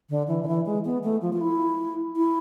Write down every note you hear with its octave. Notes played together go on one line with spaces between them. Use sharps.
D3
E3
D3
E3
G#3
B3
A3
F3
F4
E4
E4